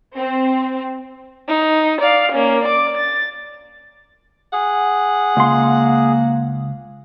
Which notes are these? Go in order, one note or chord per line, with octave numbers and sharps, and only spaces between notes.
C4
D#4
D5 F5
A#3 C#4
D5 D6
A6
G#4 F#5
C#2 A#3 C6